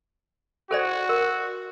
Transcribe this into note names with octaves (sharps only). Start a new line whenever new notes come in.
F#4 A4 C5 D5
A#4